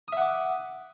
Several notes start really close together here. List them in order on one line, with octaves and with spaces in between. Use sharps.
D#6 E5 F#5 D6